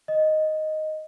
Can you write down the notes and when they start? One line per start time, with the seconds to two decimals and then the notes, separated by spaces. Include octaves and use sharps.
0.08 D#5